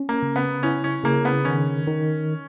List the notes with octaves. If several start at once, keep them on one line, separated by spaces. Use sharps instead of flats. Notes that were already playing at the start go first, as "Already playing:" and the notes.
Already playing: C#4
A#3
C#3
B3
C#4 E4
C#4
C#3 A#3
B3
D#3 C#4
D#3